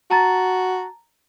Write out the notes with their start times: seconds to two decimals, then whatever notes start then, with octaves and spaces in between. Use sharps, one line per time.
0.10 F#4 A5 A#5 A6